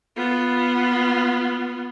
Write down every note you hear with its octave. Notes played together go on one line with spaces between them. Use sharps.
B3 F4